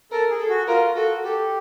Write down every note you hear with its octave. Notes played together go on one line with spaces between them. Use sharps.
A4 A#4
G#4
A4
F#4
F4 A#4
F#4 A4
G4 A4